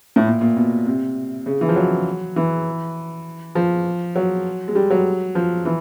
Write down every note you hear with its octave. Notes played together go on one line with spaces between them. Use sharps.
A2
A#2
A#2
B2
C3
C#3
E3
F3
F#3
E3
F3
F#3
G#3
G3
F#3
F3
E3